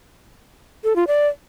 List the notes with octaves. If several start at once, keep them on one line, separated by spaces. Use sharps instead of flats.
A4
F4
D5